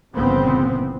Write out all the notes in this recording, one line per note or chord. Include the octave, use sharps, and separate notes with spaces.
G1 A#2 C#3 E3 B3 C4